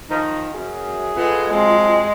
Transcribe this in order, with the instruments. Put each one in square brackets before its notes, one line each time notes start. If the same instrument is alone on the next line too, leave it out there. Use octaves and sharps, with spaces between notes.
[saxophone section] D#3 F3 [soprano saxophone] D#4
[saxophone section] F#2 [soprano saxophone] G#4
[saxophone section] G#3 A3 B3 [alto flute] F4
[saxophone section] F3 F#3 C4 [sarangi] G#3